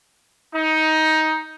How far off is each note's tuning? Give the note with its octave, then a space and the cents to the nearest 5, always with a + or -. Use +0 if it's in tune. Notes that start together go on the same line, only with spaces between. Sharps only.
D#4 +15